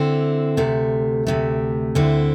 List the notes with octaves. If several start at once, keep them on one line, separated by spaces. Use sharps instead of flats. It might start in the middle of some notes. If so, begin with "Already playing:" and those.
Already playing: D3 C4 E4
D2 C3 A3
D2 C3 A3
D2 D3 C4 E4